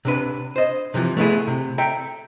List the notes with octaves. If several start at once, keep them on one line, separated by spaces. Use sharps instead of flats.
C3 D4 B4
C5 D#5
C3 E3 F3
A3 B3 E4 G#4
C3
A4 E5 G5 A#5